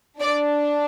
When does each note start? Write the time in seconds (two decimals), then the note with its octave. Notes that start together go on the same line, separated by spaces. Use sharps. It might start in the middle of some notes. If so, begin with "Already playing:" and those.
0.20 D4 D5